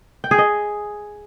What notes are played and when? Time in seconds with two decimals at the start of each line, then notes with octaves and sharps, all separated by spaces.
0.24 G5
0.31 G#4
0.38 D#5